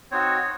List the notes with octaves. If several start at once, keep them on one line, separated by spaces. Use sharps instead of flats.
C4 D#4 F#4 C#5